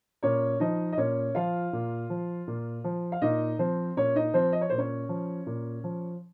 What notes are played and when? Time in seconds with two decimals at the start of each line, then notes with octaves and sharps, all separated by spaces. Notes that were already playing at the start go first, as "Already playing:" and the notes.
0.23 A#2 C#4 C#5
0.60 F3 D#4 D#5
0.92 D#5
0.97 A#2 C#4 C#5
1.35 F3 F4 F5
1.73 A#2
2.10 F3
2.48 A#2
2.84 F3
3.12 F5
3.22 A#2 D#4 D#5
3.59 F3 C4 C5
3.97 A#2 C#4 C#5
4.16 D#4 D#5
4.34 F3 C4 C5
4.52 D#5
4.61 C#5
4.70 A#2 C5
4.78 C#4 C#5
5.09 F3
5.46 A#2
5.84 F3